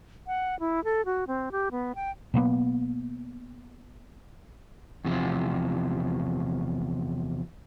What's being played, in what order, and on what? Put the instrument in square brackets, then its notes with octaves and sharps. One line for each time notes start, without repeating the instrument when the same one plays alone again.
[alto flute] F#5
E4
A4
F#4
C4
G4
B3
G5
[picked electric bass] B2 F#3 A#3 B3
[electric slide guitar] E2 C3 E3 F3